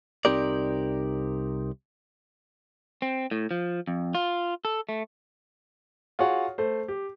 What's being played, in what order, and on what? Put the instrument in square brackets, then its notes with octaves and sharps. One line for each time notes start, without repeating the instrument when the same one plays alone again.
[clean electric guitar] C2 C4 D#4 G4 A#4 D5
[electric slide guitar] C4
A2
F3
F2
F4
A4
A3
[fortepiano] F4 F#4 G#4 C#5 F#5
A3 C5
G4